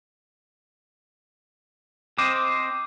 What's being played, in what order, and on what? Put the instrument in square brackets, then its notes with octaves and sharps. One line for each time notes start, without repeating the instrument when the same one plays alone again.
[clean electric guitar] C4 C5 D#5 [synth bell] D6